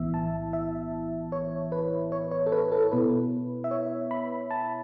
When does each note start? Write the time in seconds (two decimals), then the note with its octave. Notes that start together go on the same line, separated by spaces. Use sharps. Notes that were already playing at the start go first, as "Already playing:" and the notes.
Already playing: B1 A2 E3 B3 E4 E5
0.14 A5
0.53 E5
1.32 C#5
1.72 B4
2.12 C#5
2.31 C#5
2.46 A4
2.52 B4
2.72 A4
2.91 B2 B3 E4 B4
3.64 E5
3.71 C#5
4.11 B5
4.51 A5